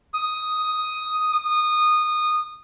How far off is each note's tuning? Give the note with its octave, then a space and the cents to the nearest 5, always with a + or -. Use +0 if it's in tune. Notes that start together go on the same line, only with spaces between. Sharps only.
D#6 +5
D#6 -20